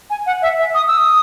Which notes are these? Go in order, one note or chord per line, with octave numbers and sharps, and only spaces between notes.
G#5
F#5
E5
E5
D#6
E6
D#6